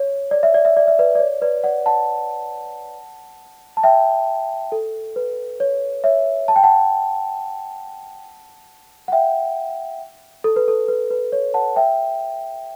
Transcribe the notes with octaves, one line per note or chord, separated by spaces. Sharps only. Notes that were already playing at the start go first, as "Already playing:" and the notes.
Already playing: C#5
D5
E5
D5
E5
D5
E5
B4 D5
D5
C#5
B4 D5
D5 F#5
F#5 A5
A5
E5 G5
A4
B4
C#5
C#5 E5
A5
G5
F#5 A5
F#5
E5 G5
A4
B4
A4
B4
B4
C#5
F#5 A5
E5 G5